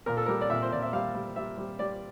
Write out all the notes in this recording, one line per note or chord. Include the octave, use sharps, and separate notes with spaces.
A#2 A#4
A4
G3 A#4
D5
A#2 E5
C5
A#2 D5
E5
G3 F5
G3
G3 E5
G3
G3 D5